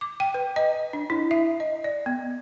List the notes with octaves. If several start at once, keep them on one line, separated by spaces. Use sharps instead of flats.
D6
G5
B4
D#5
D4
E4
E5
D#5
D5
B3